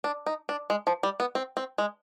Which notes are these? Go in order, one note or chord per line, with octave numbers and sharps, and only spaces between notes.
D4
D#4
D4
G#3
F3
G3
B3
C4
C4
G#3